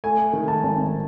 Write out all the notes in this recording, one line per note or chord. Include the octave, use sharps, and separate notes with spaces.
A3 G#5
D#3
A5
G#1